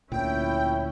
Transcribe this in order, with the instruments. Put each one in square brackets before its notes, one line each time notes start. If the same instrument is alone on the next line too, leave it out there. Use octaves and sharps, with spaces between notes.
[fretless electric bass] D2 A#2 [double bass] C#4 E4 [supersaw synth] G5